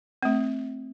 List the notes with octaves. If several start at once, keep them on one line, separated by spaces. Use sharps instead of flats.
A3 C4